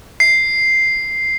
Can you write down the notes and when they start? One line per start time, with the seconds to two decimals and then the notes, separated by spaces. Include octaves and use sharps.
0.20 C7